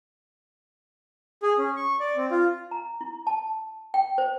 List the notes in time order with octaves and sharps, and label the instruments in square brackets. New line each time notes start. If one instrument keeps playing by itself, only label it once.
[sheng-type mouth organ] G#4
C#4
C#6
D5
C4
F4
[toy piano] A#5
E4
A5
G5
C5